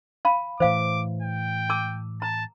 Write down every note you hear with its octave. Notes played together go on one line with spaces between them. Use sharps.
F5 A5 B5
A2 E3 C5 F5 D6
G5
A5 D6 E6
A5 A#5